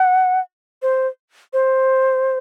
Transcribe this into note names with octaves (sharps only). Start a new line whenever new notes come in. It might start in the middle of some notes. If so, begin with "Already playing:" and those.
Already playing: F#5
C5
C5